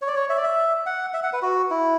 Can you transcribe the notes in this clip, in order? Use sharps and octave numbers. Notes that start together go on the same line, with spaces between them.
C#5
D5
C#5
E5
D5
E5
F#5
E5
F#5
B4
F#4
E4